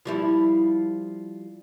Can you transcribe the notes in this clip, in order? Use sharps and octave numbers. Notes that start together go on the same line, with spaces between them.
F3 G3 E4